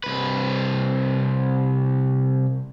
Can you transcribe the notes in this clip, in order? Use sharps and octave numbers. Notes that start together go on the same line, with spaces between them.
C2 B4